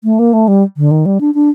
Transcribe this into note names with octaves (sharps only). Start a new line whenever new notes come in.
A3
A#3
A3
G3
D3
D#3
G3
D4
D4